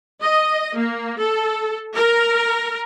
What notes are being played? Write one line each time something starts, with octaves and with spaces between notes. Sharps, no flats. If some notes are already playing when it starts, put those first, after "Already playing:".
D#5
A#3
A4
A#4